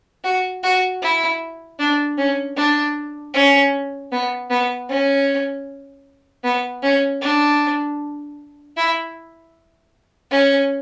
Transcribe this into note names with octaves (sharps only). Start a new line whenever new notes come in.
F#4
F#4
E4
D4
C#4
D4
C#4
B3
B3
C#4
B3
C#4
D4
E4
C#4